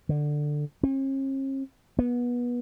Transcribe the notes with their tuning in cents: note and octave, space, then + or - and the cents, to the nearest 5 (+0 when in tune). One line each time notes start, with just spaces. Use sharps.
D3 +10
C#4 -45
B3 -25